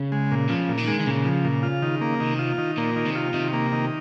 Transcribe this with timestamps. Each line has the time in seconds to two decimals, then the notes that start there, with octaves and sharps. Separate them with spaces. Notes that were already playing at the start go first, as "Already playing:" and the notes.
Already playing: C#3
0.12 G#3
0.31 A#2
0.49 C#3 F3
0.69 A#2
0.78 D#3
0.87 G#3
1.00 D#3
1.06 A#2 C#3
1.25 F3
1.45 A#2
1.63 F4
1.82 D#3
2.01 A#3
2.20 C3 D#3
2.39 F4
2.58 D#3
2.78 A#2 A#3
2.96 D#3
3.06 C3
3.15 F4
3.34 C3 D#3
3.53 A#3
3.73 D#3